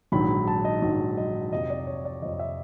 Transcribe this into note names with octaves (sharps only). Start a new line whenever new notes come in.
A#1 G#2 D#3 F#3 B5
A5
D#5
A#1 G#2 D#3 F#3
D#5
F2 C3 F3 D#5
D5
C#5
D5
F2 C3 F3 D#5
E5